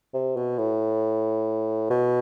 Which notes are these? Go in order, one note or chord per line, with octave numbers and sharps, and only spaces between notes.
C3
B2
A2
B2